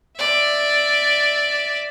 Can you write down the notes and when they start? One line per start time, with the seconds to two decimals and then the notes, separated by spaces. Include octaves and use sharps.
0.18 D5 E5